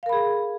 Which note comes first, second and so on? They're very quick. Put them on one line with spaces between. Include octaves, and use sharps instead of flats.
F5 A#4 B5 G#4